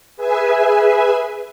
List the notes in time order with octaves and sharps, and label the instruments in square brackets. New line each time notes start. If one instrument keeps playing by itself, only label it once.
[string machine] G#4 B4 E5 G#5